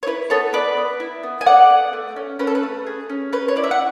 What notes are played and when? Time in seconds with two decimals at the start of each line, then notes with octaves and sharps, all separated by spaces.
0.03 C#5
0.07 E4 B4
0.30 B3 A4 C#5
0.53 B3 B4 D5
0.77 B3
1.00 E4
1.23 B3
1.41 G#5
1.46 A4 D5 F#5
1.70 B3
1.93 A3
2.16 C#4
2.39 C#4 B4
2.47 A4
2.55 B4
2.63 A3
2.87 G#4
3.10 C#4
3.33 C#4 B4
3.48 C#5
3.56 E4 D5
3.64 E5
3.71 F#5